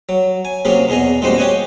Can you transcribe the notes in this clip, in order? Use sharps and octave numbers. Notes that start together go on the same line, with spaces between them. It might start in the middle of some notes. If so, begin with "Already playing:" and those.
F#3
G#5
C3 F#3 A#3 C#4 G#4
E2 B2 G#4 D#5 A#5
A1 A#2 G3 G#3 F#4 C5
G4 C#5 D#5 F#5 G#5